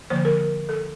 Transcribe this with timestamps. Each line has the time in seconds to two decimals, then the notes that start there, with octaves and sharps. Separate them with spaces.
0.10 D3 F3 A#3 C5
0.25 A#4
0.69 A4